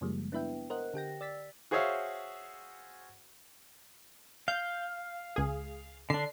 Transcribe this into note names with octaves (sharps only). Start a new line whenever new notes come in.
F#2 C#3 F3 G3 G#3 A#3
B3 D4 E4 B4 E5 G5
A#4 C5 D#5 F#5 F#6
D3 G4 G5 A#6
D5 E6 A6 B6
F#4 G#4 C5 C#5 E5 F5
F5 G6
C#2 G#4
D3 D4 C7